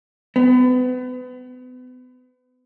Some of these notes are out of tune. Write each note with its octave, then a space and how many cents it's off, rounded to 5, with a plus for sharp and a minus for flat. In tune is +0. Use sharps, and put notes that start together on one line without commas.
B3 +35